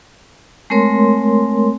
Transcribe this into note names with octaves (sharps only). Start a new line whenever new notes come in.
G#3 A3 C4 A#4 C#5 C6